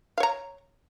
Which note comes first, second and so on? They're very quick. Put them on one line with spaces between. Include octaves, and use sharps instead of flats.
F5 C#5 A#5